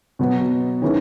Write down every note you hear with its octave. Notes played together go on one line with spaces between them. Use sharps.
B2 F#3 B3
D#3 G#3 C#4 E4 B4